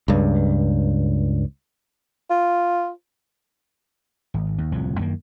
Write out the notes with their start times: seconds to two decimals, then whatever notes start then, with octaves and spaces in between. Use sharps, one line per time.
0.08 C#2 G2
2.31 F4
4.34 G#1
4.58 D#2
4.72 D1 C2 F2 F3
4.99 F#2 D#3 A#3